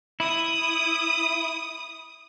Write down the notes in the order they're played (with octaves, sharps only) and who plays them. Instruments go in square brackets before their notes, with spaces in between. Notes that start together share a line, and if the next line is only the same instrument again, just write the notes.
[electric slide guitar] E4 [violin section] D#6